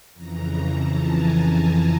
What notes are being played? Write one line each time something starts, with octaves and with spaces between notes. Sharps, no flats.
F2 C#3 E3 A#5
A5
G#5